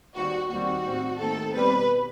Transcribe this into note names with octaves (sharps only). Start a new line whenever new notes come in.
D#2 D#3 G3 C4 F#4
D#2 D#3 G3 C4 F#4
A2 G3 C4
D#2 D#3 A3 C4 A4
B2 G3 C4 B4